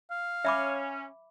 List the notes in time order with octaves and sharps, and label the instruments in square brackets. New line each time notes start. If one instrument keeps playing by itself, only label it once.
[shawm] F5
[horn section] C#4 [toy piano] E5 B5 D6